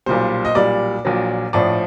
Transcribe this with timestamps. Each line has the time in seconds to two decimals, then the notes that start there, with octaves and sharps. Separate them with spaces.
0.06 B1 A#2 G3 C5
0.45 D#5
0.55 B1 A#2 G3 D5
1.05 A#1 A#2 F#3
1.53 A#1 A2 F3 D5